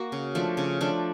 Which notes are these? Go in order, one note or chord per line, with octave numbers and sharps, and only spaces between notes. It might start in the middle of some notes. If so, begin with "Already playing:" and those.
Already playing: A#3 F#4
C#3
F3 A3 D4
C#3
F3 A3 D4